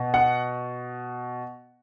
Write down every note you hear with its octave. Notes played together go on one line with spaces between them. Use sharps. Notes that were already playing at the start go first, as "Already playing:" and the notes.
Already playing: B2
F#5